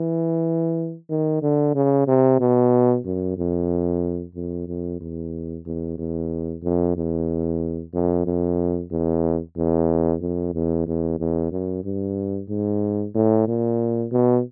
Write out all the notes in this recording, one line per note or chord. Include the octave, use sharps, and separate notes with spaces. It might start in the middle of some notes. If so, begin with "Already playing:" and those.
Already playing: E3
D#3
D3
C#3
C3
B2
F#2
F2
F2
F2
E2
E2
E2
F2
E2
F2
F2
E2
E2
F2
E2
E2
E2
F#2
G2
G#2
A2
A#2
B2